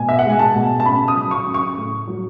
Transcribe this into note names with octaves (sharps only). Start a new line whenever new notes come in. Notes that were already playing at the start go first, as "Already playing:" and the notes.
Already playing: B2 G#5
E5
F#5
G#3 G#5
A5
B2
A5
C#3 B5
D#6
F#3
C#6
C#3
C#6
A2
F#3